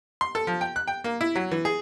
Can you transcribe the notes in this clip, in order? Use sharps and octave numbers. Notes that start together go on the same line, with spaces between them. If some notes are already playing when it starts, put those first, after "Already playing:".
C6
A4
F3
G5
F#6
G5
A#3
E4
F#3
E3
G#4